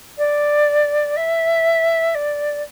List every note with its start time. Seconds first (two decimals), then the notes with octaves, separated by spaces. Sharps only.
0.18 D5
1.16 E5
2.15 D5